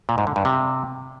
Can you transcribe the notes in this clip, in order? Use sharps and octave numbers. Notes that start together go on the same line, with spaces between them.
A#2
G#2
D3
G2
C3